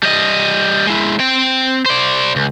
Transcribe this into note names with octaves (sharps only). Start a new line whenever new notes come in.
G3 D#5
G#3 E4
C4 G5
C5 D5
C#2